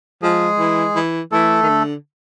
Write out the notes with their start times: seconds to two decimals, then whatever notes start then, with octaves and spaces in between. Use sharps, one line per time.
0.22 F3 G#3 G#4
0.59 E3
0.95 E3
1.32 E3 A3 A4
1.63 D#3
1.69 D3